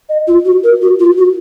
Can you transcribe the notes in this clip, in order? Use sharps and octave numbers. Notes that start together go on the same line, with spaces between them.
D#5
F4
F#4
A#4
F#4
F4
F#4